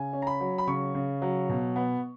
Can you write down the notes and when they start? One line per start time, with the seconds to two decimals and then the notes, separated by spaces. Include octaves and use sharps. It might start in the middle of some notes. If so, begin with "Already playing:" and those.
Already playing: C#3 G#5
0.13 C#4
0.22 A#5
0.27 B5
0.40 F#3
0.58 B5
0.67 C#3 C#6
0.95 C#3
1.22 F#3
1.49 B2
1.76 B3